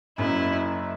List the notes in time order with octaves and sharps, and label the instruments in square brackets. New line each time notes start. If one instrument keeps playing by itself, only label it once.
[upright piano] F#1 F#2 F#3 [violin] E4